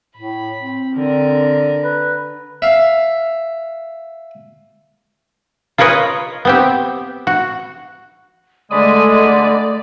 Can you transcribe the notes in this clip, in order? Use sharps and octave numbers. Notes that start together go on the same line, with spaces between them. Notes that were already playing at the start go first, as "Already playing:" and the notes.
A2 B5
C4
D3 A#4
B4
E5 F5
F4 A#4 B4 C#5 D#5
B3 C4 G4
F#4
D3 G#3 A3 D5 B5 D#6